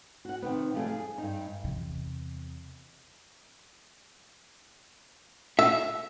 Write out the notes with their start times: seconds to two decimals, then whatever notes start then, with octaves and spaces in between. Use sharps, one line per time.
0.25 F#4 F#5
0.42 C3 D#3 B3
0.74 F3 G3 A3 E4 G4 G#4
0.89 G#4
1.18 G2 D#4
1.64 E2 C3
5.59 E5